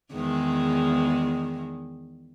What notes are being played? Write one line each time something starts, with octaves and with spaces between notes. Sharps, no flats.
E2 D#3 G#3